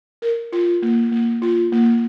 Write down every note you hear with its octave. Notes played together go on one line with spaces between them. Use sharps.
A#4
F4
A#3
A#3
F4
A#3